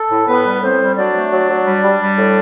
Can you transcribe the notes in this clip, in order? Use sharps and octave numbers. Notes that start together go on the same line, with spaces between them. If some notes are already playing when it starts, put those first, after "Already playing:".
Already playing: A4
A2
A2 B3 B4
G3
A2 C4 C5
G3
F#3 D4 D5
A3
F#3
F#3
G3
G3
G3
A2